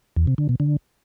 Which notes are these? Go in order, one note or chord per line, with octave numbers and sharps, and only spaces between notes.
E2
C3
D3
B2
D3